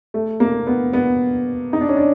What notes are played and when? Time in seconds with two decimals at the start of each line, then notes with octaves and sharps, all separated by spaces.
0.14 A3
0.40 A#3
0.67 B3
0.93 B3
1.73 D#4
1.81 D4
1.89 C#4
1.97 D4